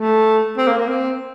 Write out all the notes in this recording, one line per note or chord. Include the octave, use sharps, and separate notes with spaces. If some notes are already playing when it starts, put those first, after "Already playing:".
Already playing: A3
C4
A#3
A#3
C4